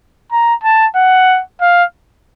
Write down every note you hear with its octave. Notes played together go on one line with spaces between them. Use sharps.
A#5
A5
F#5
F5